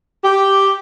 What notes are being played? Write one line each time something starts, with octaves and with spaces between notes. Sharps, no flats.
G4